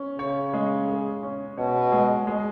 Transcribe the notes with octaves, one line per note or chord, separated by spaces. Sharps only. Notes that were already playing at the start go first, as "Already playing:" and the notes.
Already playing: C#4
C#3 C#5
G#3
G#4
C#4
B2 C#5
G#3
G#3